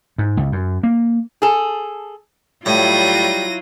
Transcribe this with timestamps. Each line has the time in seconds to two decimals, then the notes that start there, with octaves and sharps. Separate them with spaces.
0.18 G#2
0.37 C#2
0.52 F#2
0.83 A#3
1.42 G#4 A4
2.66 A2 F#3 G3 E4 F4 A#6 D#7